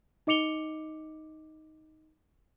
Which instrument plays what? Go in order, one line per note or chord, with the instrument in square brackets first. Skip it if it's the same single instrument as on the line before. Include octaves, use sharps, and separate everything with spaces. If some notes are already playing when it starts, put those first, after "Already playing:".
[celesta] D#4 D#5 D6 C#7 F7 G7